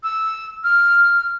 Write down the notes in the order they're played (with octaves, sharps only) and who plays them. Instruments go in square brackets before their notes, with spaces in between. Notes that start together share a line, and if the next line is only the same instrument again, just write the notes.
[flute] E6
F6